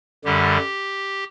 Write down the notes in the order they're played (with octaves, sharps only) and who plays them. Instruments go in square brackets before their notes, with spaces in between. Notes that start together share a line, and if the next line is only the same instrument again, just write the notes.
[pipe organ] F#2 D3 G3 G4